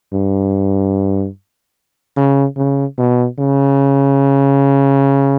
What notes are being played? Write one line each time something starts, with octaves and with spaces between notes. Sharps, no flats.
G2
C#3
C#3
B2
C#3